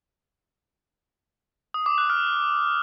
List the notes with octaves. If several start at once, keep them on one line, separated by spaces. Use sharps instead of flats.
D#6
D6
F#6
F6